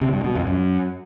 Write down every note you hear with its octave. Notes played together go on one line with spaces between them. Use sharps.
C3
G2
B2
F2
F#2